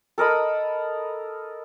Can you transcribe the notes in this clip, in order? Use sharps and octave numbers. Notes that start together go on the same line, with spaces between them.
A4 A#4 D#5 B5